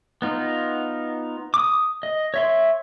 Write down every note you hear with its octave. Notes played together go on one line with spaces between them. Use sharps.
B3 D#4 F4
D6 D#6
D#5
C#5 E5 C6